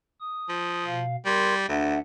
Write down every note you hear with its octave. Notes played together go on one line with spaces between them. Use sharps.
D#6
F3
B2 F5
G3 A#4 C6 G#6
D2 D4 E5 F#5